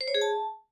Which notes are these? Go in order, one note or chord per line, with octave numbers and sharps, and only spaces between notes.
C5
C#5
G#4
A5